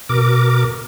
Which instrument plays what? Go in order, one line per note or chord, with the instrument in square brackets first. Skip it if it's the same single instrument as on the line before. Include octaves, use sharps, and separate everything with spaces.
[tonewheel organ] B2 A#4 D6